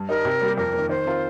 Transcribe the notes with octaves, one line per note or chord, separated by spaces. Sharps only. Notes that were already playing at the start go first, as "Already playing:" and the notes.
Already playing: G2
G3 D#4 A#4
C3
G3 A#3 G4
F2 A#4
A#3
D#3
D#3 C5
C4 F4 A#4